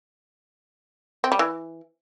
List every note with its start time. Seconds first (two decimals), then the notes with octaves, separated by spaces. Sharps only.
1.24 C4
1.32 G3
1.39 E3